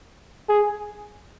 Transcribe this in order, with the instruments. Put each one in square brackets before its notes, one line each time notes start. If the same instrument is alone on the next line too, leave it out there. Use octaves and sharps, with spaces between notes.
[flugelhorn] G#4